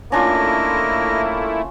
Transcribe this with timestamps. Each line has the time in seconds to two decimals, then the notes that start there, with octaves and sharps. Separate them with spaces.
0.12 A3 A#3 C#4 D4 E4 F4 D#5